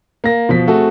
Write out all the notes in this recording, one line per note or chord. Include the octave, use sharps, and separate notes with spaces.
A#3 A#6
B2 F3 B6
A3 C4 F#4 G#4 A4